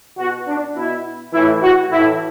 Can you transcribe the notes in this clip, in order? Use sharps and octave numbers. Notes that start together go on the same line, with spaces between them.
B2 F#4
D4
B2 E4
A2 E3 E4
F#4
A2 E3 E4